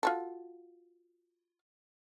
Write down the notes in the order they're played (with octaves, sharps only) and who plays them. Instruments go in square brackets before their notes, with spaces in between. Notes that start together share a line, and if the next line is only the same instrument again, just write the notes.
[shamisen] F4 F#4 A4